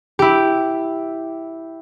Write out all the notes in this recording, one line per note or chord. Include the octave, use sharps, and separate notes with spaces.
E4 G4